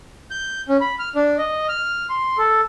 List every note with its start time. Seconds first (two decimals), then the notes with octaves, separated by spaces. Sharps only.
0.31 G6
0.69 C#4
0.81 B5
0.99 F6
1.15 D4
1.38 D#5
1.69 F6
2.09 C6
2.38 A4